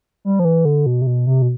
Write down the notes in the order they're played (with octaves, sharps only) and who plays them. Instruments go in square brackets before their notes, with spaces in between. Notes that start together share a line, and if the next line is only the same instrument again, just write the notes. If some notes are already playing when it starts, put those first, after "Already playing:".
[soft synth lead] G3
F3
E3
D3
B2
C3
B2
C3
B2